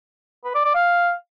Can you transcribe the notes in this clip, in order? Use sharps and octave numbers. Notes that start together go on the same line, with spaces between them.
B4
D5
D5
F5